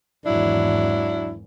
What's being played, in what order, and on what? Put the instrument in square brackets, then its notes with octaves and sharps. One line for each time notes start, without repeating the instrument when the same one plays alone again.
[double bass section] G#1 E2 [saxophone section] F#3 D4 E4